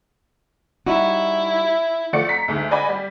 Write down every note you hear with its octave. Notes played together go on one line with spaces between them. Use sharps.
G3 D#4 E4 F#4
F3 A3 D5 F#5 C#7
A#5 B6
D2 G#2
D5 D#5 F#5 G#5 B5
G3